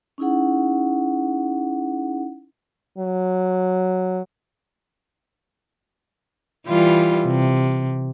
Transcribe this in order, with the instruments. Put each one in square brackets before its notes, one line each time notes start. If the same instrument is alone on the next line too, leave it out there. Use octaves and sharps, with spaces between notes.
[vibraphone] C#4 D#4 E4 G#4 F#5
[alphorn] F#3
[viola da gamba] E3 G3 F4
C3